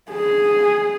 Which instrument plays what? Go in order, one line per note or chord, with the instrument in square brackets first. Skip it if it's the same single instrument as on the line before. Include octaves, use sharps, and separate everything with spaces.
[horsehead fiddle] G#4